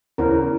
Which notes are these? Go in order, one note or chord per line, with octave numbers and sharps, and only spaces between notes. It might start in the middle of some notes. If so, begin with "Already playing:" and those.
E2 C#3 E3 A#4 C5